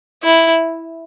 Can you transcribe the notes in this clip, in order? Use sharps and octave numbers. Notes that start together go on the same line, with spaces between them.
E4